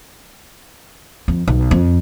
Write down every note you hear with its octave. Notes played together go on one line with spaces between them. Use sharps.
F2
B1
F2